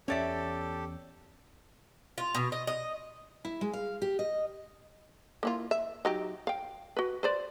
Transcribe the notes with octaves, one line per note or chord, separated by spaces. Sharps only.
E2 C#4 G4 A4 C#5 D5 E5
F4
B2
D#5
D#5
E4
G#3
F5
G4
D#5
A#3 E4 F4
E5
F#3 D#4 G4
F5 G5
F#4 B4
B4 C5 D5